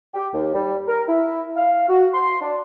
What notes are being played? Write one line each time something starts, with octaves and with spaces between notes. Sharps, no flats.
G4
D#2
G3
A#4
E4
F5
F#4
C6
D4